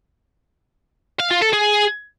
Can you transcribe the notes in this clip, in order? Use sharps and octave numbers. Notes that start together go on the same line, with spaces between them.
F5
F4
A4
G#4